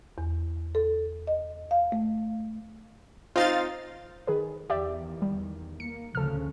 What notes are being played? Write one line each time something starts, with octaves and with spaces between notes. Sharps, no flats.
E2
A4
D#5
F5
A3
C4 D#4 F4 F5 A6
D#3 G#4 B4
E2 D#3 G4 D5 E5
G3
A#3 C#7
D2 C#3 F3 A4 F6